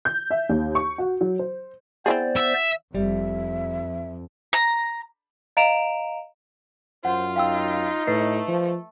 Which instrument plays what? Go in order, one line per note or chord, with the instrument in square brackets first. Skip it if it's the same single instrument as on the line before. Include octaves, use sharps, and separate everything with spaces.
[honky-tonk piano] G6
E5
D#2
C#6
F#4
F#3
C5
[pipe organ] B3 C5 D5 [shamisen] C4 E4 G#4
[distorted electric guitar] E5
[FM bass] F1 [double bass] F2 [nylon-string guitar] G3 [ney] E5
[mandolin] A#5
[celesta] D#5 F5 A#5 D7 E7 F7
[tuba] F#2 [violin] F4 [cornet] C5 [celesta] F#5
[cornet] D#4 [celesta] F5 G5 E6
[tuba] A2 [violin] A3 [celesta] B4 D#5 C7
[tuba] F3